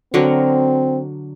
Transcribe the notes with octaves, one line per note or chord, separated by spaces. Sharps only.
D3 F#3 C4 A#4